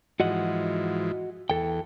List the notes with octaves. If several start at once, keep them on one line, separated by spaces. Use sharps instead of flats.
G#2 E3 F3 F#4 D#5 F#5
E2 A4 G5